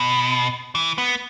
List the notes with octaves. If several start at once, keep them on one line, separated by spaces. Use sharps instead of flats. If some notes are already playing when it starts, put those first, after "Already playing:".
Already playing: B2
E3
B3